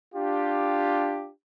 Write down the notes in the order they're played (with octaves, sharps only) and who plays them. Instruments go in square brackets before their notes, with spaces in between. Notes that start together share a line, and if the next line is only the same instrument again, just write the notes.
[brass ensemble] D4 F4 G4